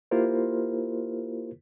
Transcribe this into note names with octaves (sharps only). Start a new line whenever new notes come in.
A#3 E4 F4 G4 A#4 C5